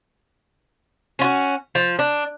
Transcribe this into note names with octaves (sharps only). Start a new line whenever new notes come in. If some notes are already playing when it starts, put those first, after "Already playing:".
C#4 F4 F#4
F3
D4